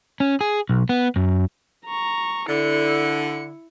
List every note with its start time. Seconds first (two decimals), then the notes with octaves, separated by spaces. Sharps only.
0.20 C#4
0.41 G#4
0.69 B1
0.89 B3
1.16 F#2
1.86 A#5 C#6
2.49 D3 E4 C#7